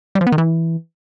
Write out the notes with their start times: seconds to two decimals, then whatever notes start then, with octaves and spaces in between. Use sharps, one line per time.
0.15 G3
0.21 F3
0.27 B3
0.32 D#3
0.38 E3